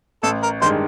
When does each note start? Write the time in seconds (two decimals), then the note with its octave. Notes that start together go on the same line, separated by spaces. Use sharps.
0.23 A1 A4
0.42 A#4
0.62 G2 D#3 G#3 C5